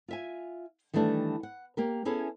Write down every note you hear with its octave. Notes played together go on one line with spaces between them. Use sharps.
F4 E5 G#5
D#3 E3 G3 A3 D4
F#5
A#3 G4 A#4
B3 C#4 E4 G#4 A4